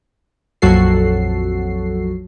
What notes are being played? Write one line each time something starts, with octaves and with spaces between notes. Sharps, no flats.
A#1 F2 F#3 F#4 A4 C7